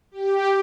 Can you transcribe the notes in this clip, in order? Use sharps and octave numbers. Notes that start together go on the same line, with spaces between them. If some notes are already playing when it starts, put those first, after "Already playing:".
G4